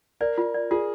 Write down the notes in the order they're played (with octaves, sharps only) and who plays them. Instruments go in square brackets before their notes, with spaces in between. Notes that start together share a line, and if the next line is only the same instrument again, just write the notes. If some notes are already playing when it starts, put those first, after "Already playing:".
[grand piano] A#4 [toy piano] D5
[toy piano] F4
D5
[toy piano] F4 [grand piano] G#4